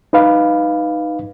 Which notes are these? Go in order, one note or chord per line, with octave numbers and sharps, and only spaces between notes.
D#4 B4 F5